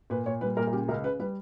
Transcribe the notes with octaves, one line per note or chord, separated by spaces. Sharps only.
A#2 B4
A#2 C#5
G3 B4
A#2 A#4
A#4
C#3 G4
C#2 A#4
C#3 B4
G3 B4